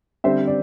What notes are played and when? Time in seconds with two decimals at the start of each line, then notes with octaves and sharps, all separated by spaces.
0.24 D3 G3 C4 C5 E5
0.47 D5